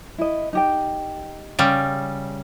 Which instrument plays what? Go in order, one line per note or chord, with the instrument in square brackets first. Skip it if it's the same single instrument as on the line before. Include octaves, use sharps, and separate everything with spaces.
[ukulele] E4 D#5
D#4 G4 G5
[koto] C#3 G3